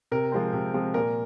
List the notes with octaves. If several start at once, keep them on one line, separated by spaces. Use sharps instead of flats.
C3 A#4
F3 G#3 C4
C3
F3 G#3 C4
A#2 A#4